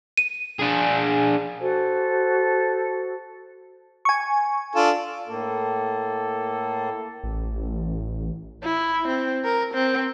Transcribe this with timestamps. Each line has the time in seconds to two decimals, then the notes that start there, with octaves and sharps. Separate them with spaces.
0.17 D#7
0.60 D4 G#4
1.59 F#4 A4 C5
4.05 G#5 C#6
4.75 D4 F4 A4
5.28 A2 A#3 A4
7.24 A1
8.63 E4
9.07 C4
9.45 A#4
9.74 C4